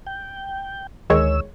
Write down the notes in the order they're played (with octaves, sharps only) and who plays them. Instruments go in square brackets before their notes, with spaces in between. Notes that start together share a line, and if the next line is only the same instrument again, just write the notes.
[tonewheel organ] G5
[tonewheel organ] D2 E6 [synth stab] D#3 G#3 C#5